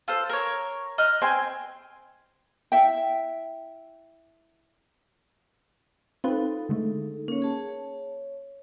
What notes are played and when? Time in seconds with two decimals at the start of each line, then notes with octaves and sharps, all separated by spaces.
0.08 F4 A4 C5
0.29 A#4 C#5
0.98 D#5 F6 F#6
1.22 C4 G5 G#5 C6
2.72 E4 E5 G5
6.24 C4 D#4 F4 A4 B4
6.69 D3 G#3 A3
7.28 A#3 C#4 C#5
7.42 G#4 A5
7.69 C#5